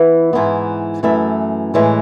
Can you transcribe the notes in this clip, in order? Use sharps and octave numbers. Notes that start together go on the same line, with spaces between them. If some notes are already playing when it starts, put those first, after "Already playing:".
Already playing: E3 B3 E4 B4
G#2 E3 B3
F#2 E3 A3 E4
A2 E3 G#3